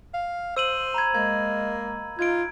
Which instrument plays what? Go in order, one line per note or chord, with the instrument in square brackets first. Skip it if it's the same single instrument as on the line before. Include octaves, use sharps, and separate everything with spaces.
[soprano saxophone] F5
[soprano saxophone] C5 [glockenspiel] E6 D#7 F#7
[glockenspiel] A#5 B5 G#6
[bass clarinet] G#3 [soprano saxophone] A#3 [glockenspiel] G#6
[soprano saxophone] D#4 [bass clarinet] F4 [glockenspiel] G#6 D7